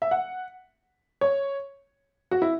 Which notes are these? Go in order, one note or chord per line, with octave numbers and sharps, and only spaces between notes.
E5
F#5
C#5
F#4
E4